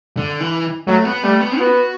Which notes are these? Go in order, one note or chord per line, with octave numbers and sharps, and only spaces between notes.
D3
E3
F#3 A3
B3
G3 A3
B3
B3 F#4